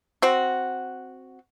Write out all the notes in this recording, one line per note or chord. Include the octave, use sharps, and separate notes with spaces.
C4 F#4